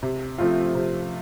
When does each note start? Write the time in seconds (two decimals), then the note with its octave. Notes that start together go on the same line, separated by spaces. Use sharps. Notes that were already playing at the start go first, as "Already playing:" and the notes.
0.03 C3
0.38 F3 A3 C4 F4
0.75 C3